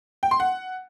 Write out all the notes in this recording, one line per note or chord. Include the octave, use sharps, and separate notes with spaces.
G5
C6
F#5